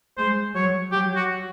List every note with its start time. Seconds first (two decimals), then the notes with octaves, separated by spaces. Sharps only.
0.18 G#3 C5
0.55 F#3 C#5
0.92 F#3 G4
1.16 F#4